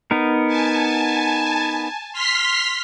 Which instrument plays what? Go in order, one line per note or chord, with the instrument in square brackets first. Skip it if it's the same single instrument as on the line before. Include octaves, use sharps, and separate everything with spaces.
[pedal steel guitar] B3 D#4 A#4
[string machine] G#5 A5
C6 F6 B6